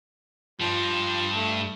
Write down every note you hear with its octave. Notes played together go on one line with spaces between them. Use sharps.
G2 F3 G3
A3